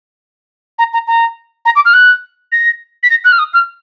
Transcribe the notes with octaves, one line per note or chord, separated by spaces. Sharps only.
A#5
A#5
A#5
A#5
D6
F6
F#6
A#6
B6
A#6
F#6
F6
D#6
F6